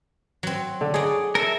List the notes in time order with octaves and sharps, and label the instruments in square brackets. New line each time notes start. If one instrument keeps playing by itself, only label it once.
[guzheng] F#3 C4
[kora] D3
[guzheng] D#4 D5 [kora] G#4 C#5
[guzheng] A4 [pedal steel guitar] A#4 E5